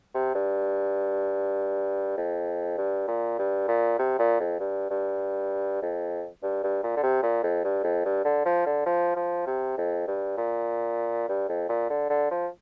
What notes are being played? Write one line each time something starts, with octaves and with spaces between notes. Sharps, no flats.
C3
G2
F2
G2
A#2
G2
A#2
C3
A#2
F2
G2
G2
F2
G2
G2
A#2
D3
C3
A#2
F2
G2
F2
G2
D3
F3
D3
F3
F3
C3
F2
G2
A#2
G2
F2
A#2
D3
D3
F3